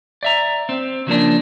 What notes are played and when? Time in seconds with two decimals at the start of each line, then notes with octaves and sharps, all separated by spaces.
0.23 D5 E5 A#5
0.69 C4
1.07 C#3 F3 A#3 D4